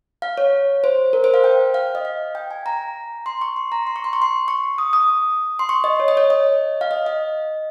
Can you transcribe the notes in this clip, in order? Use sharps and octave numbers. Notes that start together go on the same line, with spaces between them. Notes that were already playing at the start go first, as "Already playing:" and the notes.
F5
C#5
C5
A#4
C5
F5
G5
F5
D#5
F5
G5
G#5
A#5
C6
C#6
C6
A#5
C6
C#6
C6
C#6
C6
C#6
D#6
D#6
C6
C#6
D#5
C#5
D#5
C#5
D#5
F5
D#5
D#5